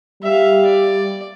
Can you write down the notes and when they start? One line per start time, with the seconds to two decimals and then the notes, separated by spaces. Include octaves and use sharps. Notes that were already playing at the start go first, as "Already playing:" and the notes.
0.22 G3 E5 F5
0.65 D5